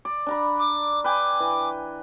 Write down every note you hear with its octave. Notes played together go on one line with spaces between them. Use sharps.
D5
D4 A#5 B5
D6
B4 G5 G#5 D6
E3